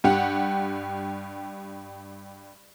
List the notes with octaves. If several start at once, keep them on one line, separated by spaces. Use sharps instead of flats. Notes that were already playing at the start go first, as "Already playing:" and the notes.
G2 G4 F#5